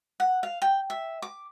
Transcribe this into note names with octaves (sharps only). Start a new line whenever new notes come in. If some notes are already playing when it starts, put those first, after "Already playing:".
F#5
F5
G5
E5
D6